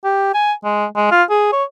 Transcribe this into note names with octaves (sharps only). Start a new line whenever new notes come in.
G4
G#5
G#3
G#3
F4
G#4
C#5